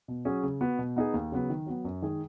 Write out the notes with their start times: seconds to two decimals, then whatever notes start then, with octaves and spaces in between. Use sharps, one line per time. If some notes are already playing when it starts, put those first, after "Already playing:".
0.08 B2
0.25 F#3 C#4 G#4
0.43 C#3
0.61 B3 F#4
0.79 B2
0.96 B3 D#4 G#4
1.14 D#2
1.32 C#3 F#3 B3
1.50 D#3
1.66 F#3 B3
1.85 F#2
2.02 D#3 G#3 D#4 G#4